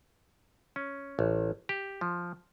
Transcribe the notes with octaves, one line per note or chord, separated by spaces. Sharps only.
C#4
A1
G4
F3